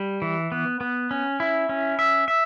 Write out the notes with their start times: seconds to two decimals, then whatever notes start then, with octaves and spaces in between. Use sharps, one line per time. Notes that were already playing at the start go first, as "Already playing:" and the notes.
Already playing: G3
0.22 E3
0.52 B3
0.81 B3
1.11 C#4
1.40 E4
1.69 C#4
1.99 E5
2.28 E5